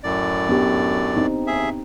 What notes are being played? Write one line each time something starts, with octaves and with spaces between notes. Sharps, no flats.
F#2 A2 D5
B3 D4 G4
C4 D#4
D#2 G#4 E5